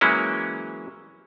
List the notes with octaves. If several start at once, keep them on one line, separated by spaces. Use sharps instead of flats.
E3 F#3 G#3 A#3 C#4 E4